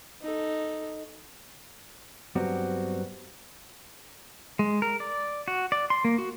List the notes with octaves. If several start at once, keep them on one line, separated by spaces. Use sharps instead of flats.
D#4 A4
G2 F#3 G3 B3 C4 F#4
G#3
A#4
D5
F#4
D5
C6
A#3
F#4